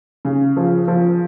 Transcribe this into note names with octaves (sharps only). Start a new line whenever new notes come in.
C#3
F3
F3